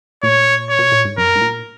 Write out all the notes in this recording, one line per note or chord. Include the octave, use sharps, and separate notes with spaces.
A#2 C#5
C#5
B2
A#2
G#2
F#2 A#4
G#2
A#2